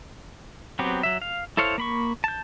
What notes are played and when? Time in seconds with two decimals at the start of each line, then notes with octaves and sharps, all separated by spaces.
0.79 F#3 B3 C4 G4
1.03 F#3 E5
1.22 F5
1.57 E4 A4 C5 C#5 F5
1.78 A#3 B5 C#6
2.24 A5 G6